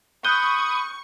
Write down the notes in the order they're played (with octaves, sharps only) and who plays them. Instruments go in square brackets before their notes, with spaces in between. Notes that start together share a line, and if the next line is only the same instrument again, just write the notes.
[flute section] B5 [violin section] C#6 [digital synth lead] D#6 [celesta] F#6 G6 G7